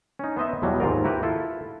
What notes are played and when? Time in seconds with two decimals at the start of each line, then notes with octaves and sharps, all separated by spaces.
0.19 C#4 D#4
0.37 B3 C5 D#5 E5
0.62 E2 B2 F#3 G3
0.80 D#2 G#2 F4 A#4
1.04 E4 F#4 G4 A#4 B4
1.23 E4 F4 A4